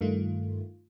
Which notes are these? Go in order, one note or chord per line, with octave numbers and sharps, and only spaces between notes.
G2 D#3 A3 F4